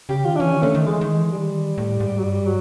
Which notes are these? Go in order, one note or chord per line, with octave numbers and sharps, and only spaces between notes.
C#3 G4
D#3 F4
D4
E3 C#4
D#3
D3 A3
D#3
E3 G#3
D#3
E3
D#3 G3
A2
G#2
F#3
G2 G3
F#3